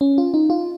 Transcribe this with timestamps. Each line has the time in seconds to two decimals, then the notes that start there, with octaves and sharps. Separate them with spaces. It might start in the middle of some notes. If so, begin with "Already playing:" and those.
0.01 C#4
0.18 F4
0.34 D#4
0.50 F4